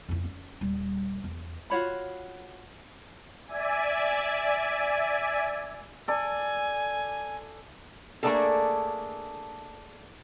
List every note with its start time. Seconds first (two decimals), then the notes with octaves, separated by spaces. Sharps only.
0.09 F2 E4
0.24 C#4
0.61 D#1 G3
1.24 E2
1.70 F4 F#4 C#5 B5
3.47 D5 E5 G#5
6.08 A4 D5 G#5
8.23 A3 A#3 C4 D4 G#4 A4